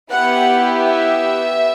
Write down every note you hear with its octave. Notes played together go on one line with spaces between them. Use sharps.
B3 E4 G4 F#5
E5